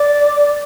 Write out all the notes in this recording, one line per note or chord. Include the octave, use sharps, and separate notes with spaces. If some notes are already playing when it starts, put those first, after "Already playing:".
Already playing: D5